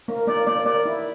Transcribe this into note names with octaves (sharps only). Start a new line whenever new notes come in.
A#3
A#3 D5
A#3 D5
A#3 D5
E4